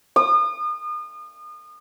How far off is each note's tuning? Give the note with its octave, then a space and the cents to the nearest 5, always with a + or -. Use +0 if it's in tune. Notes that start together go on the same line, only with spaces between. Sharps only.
D#6 -35